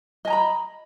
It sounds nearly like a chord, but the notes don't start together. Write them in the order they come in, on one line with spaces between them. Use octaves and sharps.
D#5 G#5 A#5 B5